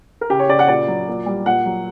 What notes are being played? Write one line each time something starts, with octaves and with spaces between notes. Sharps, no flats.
A#4
C#3 G4
C#5
C#3 D5
F#5
A#2 D5
F#3
A#2
G3
A#2 F#5
F#3